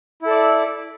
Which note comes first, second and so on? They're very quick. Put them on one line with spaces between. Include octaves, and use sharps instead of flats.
E4 A4 D5